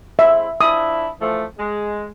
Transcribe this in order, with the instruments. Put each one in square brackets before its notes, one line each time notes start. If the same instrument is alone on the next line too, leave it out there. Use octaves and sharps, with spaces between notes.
[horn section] G#3 C4 E4 [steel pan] E5
[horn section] F3 D4 E4 [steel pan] D#6
[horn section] E3 F3 A3
G#3